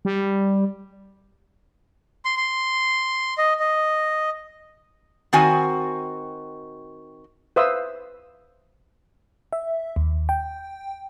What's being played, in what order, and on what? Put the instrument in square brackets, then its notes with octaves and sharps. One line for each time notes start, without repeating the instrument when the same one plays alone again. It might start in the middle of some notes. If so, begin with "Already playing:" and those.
[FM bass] G3
[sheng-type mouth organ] C6
C6
D#5
D#5
[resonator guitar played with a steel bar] D#3 C4 F#4 G#5
[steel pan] B4 C5 E5 F5 D#6 E6
[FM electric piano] E5
D#2
G5